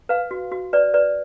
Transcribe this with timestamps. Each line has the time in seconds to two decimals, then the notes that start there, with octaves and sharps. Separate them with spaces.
0.09 B4 F5
0.31 F#4
0.52 F#4
0.73 B4 D5
0.94 B4 D5